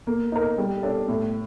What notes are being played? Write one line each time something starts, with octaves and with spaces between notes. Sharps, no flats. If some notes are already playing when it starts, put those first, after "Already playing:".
A#3
D#4 A#4
G3
D4 A4 D5
A2